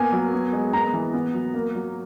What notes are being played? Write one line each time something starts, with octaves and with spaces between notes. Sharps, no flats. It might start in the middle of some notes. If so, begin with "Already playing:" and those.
Already playing: A#3 B3 G#5
F#3
B3
G#3
B3 A#5
E3
B3
F#3
A#3
F#3